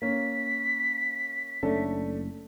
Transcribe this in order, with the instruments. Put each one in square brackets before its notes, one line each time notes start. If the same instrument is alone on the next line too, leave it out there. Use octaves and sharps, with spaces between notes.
[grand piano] A#3 C#4 [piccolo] B6
[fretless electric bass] F#1 C#4 [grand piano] A3 D4 A4